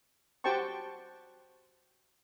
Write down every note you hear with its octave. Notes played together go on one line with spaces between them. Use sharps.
F#4 G4 C5 G5 A5 C#6